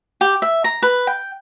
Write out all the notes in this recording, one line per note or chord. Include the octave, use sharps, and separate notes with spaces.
G4
E5
A#5
B4
G5